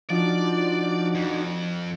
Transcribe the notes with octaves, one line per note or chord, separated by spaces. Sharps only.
F3 D4 D#4 F#4 D5
F2